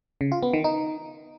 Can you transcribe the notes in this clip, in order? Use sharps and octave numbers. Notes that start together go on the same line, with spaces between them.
C#3
F4
B3
D#3
D#4